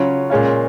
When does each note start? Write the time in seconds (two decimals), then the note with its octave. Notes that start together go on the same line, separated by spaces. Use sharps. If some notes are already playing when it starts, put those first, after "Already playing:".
Already playing: C#3 F#3 C#4 F4
0.30 A#2 G#3 C#4 F4